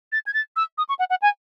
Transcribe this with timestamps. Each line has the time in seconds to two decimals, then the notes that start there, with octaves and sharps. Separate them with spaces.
0.12 A6
0.26 G#6
0.34 A6
0.56 E6
0.78 D#6
0.89 C#6
0.99 F#5
1.10 F#5
1.22 G#5